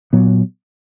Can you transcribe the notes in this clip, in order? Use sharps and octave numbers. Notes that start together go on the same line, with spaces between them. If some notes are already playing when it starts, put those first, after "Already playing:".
A#2 F#3 B3